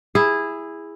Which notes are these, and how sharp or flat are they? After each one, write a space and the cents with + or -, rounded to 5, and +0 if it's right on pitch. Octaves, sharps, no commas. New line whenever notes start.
E4 +0 G#4 -15